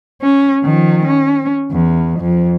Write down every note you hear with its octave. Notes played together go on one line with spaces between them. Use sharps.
C#4
D#3 F3
C#4
E2
F2